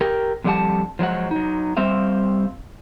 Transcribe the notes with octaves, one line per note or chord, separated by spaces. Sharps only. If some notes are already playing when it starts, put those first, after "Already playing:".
G4 A#4 G5
F2 D3 G3 E4 F#5 A5
F3 F#3 G#3 F#5
F#3 D#4
G3 C4 C5 E5 F5